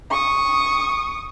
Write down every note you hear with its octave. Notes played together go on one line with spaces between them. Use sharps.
C#6 D#6